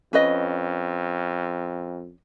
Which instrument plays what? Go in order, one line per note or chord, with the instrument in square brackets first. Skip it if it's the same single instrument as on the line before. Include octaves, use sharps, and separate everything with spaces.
[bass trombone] F2 [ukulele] C#4 B4 D#5